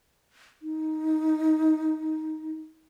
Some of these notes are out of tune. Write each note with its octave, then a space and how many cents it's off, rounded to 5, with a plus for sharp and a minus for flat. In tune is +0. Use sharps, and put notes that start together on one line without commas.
D#4 +10